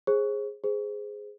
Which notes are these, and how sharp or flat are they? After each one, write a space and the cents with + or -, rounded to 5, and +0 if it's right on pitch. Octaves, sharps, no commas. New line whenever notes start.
G#4 -5 C5 +35
G#4 +0 C5 -15